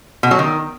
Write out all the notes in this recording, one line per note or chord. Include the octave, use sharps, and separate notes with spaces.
B2
F#3
D#3